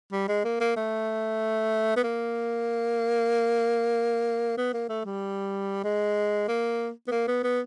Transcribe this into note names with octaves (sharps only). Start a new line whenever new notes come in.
G3
G#3
A#3
A#3
A3
B3
A#3
B3
A#3
A3
G3
G#3
A#3
B3
A#3
B3
B3